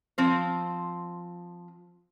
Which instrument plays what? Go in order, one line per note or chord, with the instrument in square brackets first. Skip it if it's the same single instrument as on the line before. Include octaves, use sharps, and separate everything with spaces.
[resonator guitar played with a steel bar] F3 C4 C5